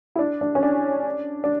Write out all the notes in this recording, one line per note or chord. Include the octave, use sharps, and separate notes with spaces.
E4
D4
D4
C#4
D4
D4